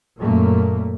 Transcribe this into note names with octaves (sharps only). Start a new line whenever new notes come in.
F#2 A#2 A3 A#3